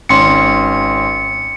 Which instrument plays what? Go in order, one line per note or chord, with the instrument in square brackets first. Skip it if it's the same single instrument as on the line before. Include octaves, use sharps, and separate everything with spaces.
[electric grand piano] G#1 C#4 C6 [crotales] C#7